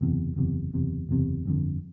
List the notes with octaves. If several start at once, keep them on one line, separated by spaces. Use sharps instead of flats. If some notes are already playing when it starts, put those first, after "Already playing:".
F#1 E2 C3
F#1 E2 C3
F#1 E2 C3
F#1 E2 C3
G1 F2 D3